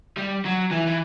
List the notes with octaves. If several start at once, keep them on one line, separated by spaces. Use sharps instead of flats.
G3
F#3
E3
E3